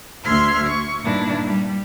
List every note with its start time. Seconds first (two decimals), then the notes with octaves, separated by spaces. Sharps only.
0.24 D2 E5 C6 F6 G#6
0.67 C#6
1.04 G2 A#2 D#3 D4 E4
1.45 G3